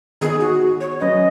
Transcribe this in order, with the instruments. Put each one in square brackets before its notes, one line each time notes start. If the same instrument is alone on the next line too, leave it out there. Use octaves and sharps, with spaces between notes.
[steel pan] D#3 B3 D#4 [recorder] G#4
[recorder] F#4
C#5
[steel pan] F#3 C#4 B4 [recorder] D#5